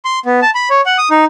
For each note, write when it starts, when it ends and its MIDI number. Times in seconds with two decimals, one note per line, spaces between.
0.05 0.19 84
0.26 0.40 59
0.42 0.51 81
0.55 0.69 83
0.70 0.81 73
0.86 0.98 78
0.98 1.09 87
1.11 1.25 63